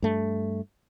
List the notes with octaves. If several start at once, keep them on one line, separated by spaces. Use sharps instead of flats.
G2 A3